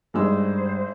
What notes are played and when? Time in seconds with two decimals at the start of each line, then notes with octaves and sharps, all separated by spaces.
0.14 G#1 G2 G3 G#3 G4 C5 E6